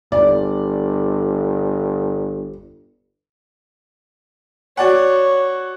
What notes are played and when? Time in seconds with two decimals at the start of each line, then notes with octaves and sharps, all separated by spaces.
0.12 G1 D5
4.77 F#4 C#5 D5 F#5